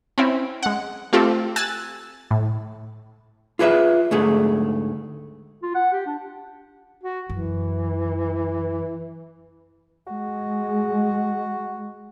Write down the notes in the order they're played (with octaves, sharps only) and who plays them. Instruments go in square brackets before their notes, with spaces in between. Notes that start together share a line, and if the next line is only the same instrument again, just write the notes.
[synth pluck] C4 C#4 E4
G#3 F#5
A3 C4 F4 G4 A4
G#5 E6 F#6 A6
A2
[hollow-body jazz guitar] F4 G#4 B4 D5 E5
D2 G#2 A3 G#4
[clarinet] F4
F#5
G4
D4
[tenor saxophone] F#4
[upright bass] F#2 [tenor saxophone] E3
[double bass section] G#3 [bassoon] F#4